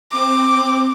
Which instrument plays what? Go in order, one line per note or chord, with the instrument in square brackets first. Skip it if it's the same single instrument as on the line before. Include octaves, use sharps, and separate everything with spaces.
[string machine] C4 [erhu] D6